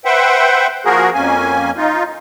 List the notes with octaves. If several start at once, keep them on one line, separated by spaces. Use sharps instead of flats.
B4 C5 E5 F#5 G5
F3 A#3 F#4 G#4 A#4
F2 A#3 C#4 G#5
D#4 F4